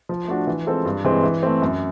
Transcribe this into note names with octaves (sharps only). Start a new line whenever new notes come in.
F3
A3 D4 F#4
E3
G#3 C4 F4 A4
G2
E3 G#3 C4
E3
A3 C4
F#2